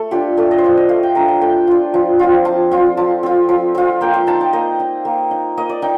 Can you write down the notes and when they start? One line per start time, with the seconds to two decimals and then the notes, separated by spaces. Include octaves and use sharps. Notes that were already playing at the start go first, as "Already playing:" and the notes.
Already playing: A3 A4
0.11 D4 F4 G4
0.37 A3 A4
0.51 D#5
0.58 C5
0.64 D4 F4 D5
0.77 D#5
0.89 A3 F5
1.03 G5
1.15 D4 F4 A#5
1.28 A5
1.41 A3 G5
1.67 D4 F4
1.94 F3
2.19 C4 F4
2.45 F3 A5
2.71 C4 F4
2.97 F3 A5
3.23 C4 F4
3.49 F3
3.75 C4 F4
4.01 A#3 G5
4.14 F5
4.27 D#4 A5
4.41 G5
4.53 A#3 D#5
4.80 D#4
5.05 A#3
5.31 D#4
5.57 A#3 D#5
5.69 D5
5.82 D#4 G5